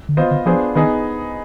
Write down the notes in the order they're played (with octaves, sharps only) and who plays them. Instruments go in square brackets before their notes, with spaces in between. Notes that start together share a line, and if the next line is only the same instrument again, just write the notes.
[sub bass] D3
[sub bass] D#3 [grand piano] B3 F4 C5 D#5
[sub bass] D3
[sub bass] F3 [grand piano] B3 D4 F4 G#4 C5
[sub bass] D#3 [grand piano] B3 D#4 G#4